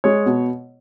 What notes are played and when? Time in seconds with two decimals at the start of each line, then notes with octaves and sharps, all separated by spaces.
0.04 G#3 C#5
0.26 B2